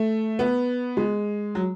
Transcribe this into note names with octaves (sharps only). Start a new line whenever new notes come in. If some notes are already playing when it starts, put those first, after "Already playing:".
Already playing: A3
B3
G#3
F#3